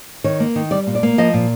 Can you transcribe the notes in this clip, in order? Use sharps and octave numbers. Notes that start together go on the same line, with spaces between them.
D#3 C#5
A#3
D#3
G3 D5
A#2
D5
A#3
F3 D#5
A#2